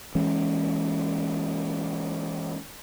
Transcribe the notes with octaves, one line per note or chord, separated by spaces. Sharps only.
E3 G#3 C#4